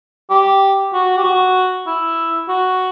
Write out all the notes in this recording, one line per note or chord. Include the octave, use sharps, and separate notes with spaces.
G4
F#4
G4
F#4
E4
F#4